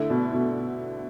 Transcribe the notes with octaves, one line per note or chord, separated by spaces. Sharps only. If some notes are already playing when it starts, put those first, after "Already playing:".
Already playing: D3 A3 E4
B2
B2